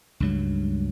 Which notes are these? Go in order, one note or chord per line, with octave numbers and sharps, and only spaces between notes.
C#2 G2 F#3